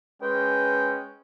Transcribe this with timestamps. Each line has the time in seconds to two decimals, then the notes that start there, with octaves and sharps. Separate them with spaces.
0.22 G#3 C#4 B4 G5